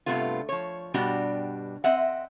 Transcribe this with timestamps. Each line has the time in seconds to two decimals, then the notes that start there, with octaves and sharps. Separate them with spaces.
0.06 G2 C3 A3 B3 F4
0.49 F3 C#5
0.94 G2 B2 G3 D4 F#4 G4
1.84 C4 D#5 E5 F#5